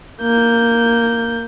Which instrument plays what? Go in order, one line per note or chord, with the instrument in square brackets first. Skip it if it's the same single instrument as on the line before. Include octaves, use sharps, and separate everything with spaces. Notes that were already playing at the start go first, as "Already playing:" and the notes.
[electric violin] A#3 G6